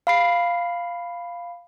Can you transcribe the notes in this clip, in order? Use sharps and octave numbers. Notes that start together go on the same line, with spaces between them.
F5 B5 C7